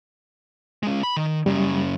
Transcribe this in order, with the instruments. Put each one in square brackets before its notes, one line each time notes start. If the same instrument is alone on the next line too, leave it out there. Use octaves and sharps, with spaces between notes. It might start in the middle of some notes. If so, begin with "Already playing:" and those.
[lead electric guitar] G#3 C#4
B5
D#3
[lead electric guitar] F#2 C#3 [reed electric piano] G3